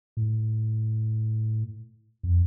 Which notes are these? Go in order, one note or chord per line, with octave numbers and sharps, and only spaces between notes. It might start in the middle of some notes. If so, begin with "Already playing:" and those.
A2
F2